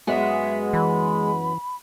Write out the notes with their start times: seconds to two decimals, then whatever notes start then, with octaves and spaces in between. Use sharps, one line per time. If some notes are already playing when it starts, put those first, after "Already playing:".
0.07 F#2 G#3 B3 F#4 E5
0.73 E3 B5